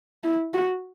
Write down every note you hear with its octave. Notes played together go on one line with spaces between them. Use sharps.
E4
F#4